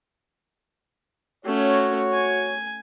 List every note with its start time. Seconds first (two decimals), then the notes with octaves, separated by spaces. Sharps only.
1.45 A3 C#4 F#4 C#5
2.13 G#5